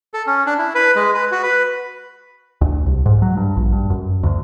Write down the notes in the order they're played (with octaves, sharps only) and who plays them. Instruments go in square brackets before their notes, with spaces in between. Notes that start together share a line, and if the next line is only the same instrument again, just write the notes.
[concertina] A4
C#4
D4
E4
B4
G#3
B4
F#4
B4
[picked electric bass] D2
C2
G#2
F#3
G2
A#1
G2
F#2
D2